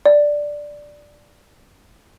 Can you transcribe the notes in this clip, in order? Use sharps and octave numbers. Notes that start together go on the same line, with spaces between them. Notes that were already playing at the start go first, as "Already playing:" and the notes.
D5